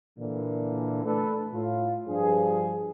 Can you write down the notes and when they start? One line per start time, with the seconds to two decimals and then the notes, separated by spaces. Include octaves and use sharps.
0.19 A#2 D3 E3
1.05 A3 D4 A4 B4
1.54 A2 F4
2.08 G2 F3 G#4